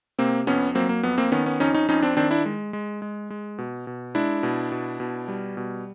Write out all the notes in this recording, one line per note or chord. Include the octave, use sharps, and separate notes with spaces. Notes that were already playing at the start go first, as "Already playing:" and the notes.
C3 A#3 C4
F2 B3 C#4
F#3 A#3 C4
A#3
F2 B3
A#3 C4
D#3 B3 C#4
B3 C#4
F2 C#4 D#4
C#4 D#4
F2 C#4 D#4
C4 D4
D#3 C4 D4
D4 E4
G#3
G#3
G#3
G#3
B2
B2
G#3 D4 E4
B2
B2
B2
G3
B2